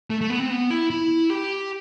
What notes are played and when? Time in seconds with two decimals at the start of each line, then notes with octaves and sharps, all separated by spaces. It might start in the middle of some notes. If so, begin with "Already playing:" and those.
0.10 A3
0.21 A3
0.30 B3
0.40 C4
0.50 B3
0.71 E4
0.90 E4
1.30 G4